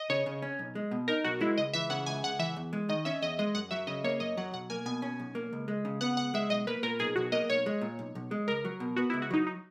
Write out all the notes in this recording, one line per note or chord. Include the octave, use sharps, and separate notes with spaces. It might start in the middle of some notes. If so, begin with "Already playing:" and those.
Already playing: D#5
C#3 C#5
C#3
C#4
B1
G#3
B2
D#4 A#4
B1 F#4
G#3 E4
C#2 D#5
E3 E5
C#3 F#5
C#2 G#5
C#2 F#5
E3 E5
E2
G#3
D#3 D#5
C#4 E5
E2 D#5
G#3 D#5
F#2 F#5
F#3 E5
C#3 D#5
A#3 C#5
F#2 D#5
F#3 F#5
B1 F#5
A#3 G#5
B2 G#5
C#4
B1
A#3
C#2
G#3
C#3
B3 F#5
C#2 F#5
G#3 E5
B1 D#5
A#3 B4
A#2 A#4
B1 G#4
B1 F#4
A#3 D#5
B1 C#5
G#3
A#2
B1
B1
G#3
C#2 A#4
F#3
B2
B3 F#4
E4
C#2
F#4
F#3 D#4
D#4